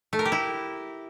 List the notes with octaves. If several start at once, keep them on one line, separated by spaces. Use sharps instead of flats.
A3
A#4
G4
E4